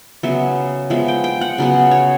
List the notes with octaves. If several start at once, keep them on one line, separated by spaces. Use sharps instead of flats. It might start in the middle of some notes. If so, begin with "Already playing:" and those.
C#3 F#3 B3 E5
F3 G#3 B3 E5
G5
G5
F#5
C#3 F#3 B3
C#5